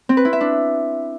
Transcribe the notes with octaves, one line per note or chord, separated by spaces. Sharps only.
C4
B4
E4
E5
D4